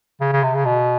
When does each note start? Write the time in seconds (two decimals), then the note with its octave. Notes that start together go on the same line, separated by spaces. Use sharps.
0.20 C#3
0.32 C#3
0.43 C3
0.54 C#3
0.65 B2